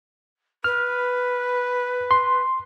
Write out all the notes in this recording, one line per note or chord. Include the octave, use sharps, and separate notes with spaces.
B4 F6
C6